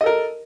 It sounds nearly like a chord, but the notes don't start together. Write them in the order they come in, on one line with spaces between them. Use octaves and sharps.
D#5 A4 A#4